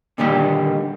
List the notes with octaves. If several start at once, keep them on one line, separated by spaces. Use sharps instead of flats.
A#2 D3 D#3 G3 A#3 G4